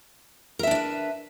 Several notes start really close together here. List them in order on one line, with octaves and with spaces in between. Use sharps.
A#4 E5 D4 D5 B4